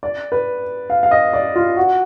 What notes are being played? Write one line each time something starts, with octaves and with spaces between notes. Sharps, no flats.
D5
B4
F5
F5
D#5
D5
F4
F#4